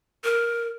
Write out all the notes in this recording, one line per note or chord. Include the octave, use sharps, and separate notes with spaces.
A#4